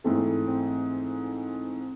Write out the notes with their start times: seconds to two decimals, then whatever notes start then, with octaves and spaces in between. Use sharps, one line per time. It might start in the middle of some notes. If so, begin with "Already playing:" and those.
0.04 G#2 E3 A3 C4
0.48 C4